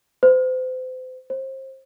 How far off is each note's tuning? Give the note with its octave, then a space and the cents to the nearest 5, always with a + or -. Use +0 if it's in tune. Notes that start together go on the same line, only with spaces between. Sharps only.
C5 -35
C5 +30